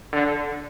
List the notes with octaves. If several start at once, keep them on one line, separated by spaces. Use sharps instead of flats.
D3